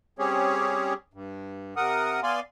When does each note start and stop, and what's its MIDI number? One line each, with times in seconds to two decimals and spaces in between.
0.19 0.94 55
0.19 0.94 60
0.19 0.94 61
0.19 0.94 67
0.19 0.94 68
0.19 0.94 73
1.14 1.74 43
1.76 2.20 48
1.76 2.20 70
1.76 2.20 78
1.76 2.20 87
2.23 2.40 59
2.23 2.40 74
2.23 2.40 77
2.23 2.40 80
2.23 2.40 84